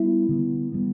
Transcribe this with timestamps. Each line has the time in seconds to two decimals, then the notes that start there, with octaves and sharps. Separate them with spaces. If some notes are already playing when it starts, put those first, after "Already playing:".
Already playing: G3 B3 E4
0.29 D3 G3 B3
0.72 D3 G3 B3